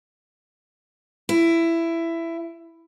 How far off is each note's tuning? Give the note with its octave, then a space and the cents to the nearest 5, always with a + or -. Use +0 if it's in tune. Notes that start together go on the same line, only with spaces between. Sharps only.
E4 +15